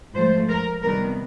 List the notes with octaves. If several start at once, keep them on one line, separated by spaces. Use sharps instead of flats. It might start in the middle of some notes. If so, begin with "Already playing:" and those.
G#2 F3 A3 C5
A#4
C3 D#3 G3 B3 A#4